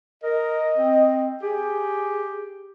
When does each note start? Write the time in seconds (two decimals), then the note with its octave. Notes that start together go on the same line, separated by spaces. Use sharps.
0.23 A#4 D#5
0.77 C4
1.42 G4 G#4